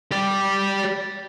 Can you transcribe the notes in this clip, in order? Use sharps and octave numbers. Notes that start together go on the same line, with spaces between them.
G4 D5